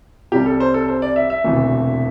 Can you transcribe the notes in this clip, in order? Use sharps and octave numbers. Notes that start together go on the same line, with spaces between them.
C2 C3 G3 G4
A4
C5
A4
C5
D5
E5
E5
E1 D2 C3 E3 A3